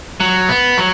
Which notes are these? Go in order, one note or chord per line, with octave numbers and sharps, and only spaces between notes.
F#3
B3
F#3